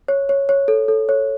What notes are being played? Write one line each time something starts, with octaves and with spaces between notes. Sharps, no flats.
C#5
C#5
C#5
A4
A4
C#5